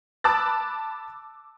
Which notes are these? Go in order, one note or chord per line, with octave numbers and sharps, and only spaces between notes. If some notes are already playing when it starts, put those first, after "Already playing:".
A5 B5 D6 E6 F#6 A6